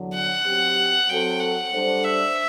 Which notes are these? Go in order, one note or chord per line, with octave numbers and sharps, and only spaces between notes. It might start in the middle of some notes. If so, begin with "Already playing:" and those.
Already playing: E2 D3 F#3
F#5
F#3 C4 G4
F#3 C4 F#4 A4 G5
F#5
G3 D4 A4 C5
E5